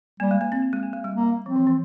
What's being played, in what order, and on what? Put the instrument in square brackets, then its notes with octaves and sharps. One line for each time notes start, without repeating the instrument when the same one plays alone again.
[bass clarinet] G3 [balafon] A#3
[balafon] G#3
A#3
C4
A#3
G#3
A#3
G#3
G3
[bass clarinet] A#3
[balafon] F3 [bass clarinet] C4
[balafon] E3
E3